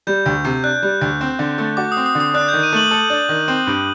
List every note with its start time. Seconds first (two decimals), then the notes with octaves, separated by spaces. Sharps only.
0.07 G3 G6
0.26 D2
0.44 C3
0.64 D4 F#6
0.82 G3
1.01 D2
1.21 C4
1.39 D3
1.58 A3
1.77 F#4 D6
1.92 D#6
1.97 C4
2.06 D#6
2.15 D3
2.20 D#6
2.34 D4 F#6
2.48 D#3 G6
2.63 D#7
2.73 A3 F#7
2.91 A4
3.10 D4
3.29 D#3
3.48 C4
3.67 G2